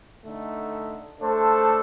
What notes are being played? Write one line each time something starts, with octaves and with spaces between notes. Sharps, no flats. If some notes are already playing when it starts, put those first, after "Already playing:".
D3 A3 D#4
A3 D4 A4 C5